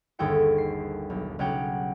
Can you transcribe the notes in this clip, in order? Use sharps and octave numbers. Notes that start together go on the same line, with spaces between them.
G1 D#2 G#4 A4 G5 C#7
C7
B1
B1 C#3 C#4 G4 F#5 G5